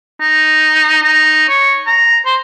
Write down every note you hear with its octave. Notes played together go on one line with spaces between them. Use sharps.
D#4
D#4
C#5
A#5
C5